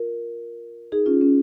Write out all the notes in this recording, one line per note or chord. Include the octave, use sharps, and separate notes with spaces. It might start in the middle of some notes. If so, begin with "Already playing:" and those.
Already playing: F4 A#4
D#4 G#4
C#4 F4
C#4